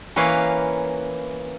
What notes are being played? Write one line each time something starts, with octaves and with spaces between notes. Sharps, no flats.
E3 A#3 C#4 B4 C#5 F5